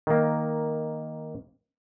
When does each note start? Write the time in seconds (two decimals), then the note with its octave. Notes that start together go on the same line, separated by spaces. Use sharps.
0.07 D#3 A#3